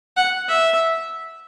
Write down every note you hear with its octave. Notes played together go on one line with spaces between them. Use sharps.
F#5
E5